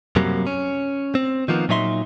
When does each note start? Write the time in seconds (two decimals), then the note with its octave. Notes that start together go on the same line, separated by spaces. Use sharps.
0.16 F#2 C3 F#3 G3 A#3
0.47 C#4
1.15 C4
1.48 D#3 F3 A#3 B3
1.69 A#2 F#3 D#4 E5 C6